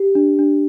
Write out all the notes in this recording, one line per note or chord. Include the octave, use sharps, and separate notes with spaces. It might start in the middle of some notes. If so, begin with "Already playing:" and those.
Already playing: G4
D4
D4